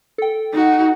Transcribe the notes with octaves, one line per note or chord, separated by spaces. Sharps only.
A4 G5
D#4 F#4